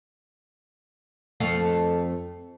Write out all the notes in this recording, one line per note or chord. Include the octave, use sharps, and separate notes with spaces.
F2 A3 F5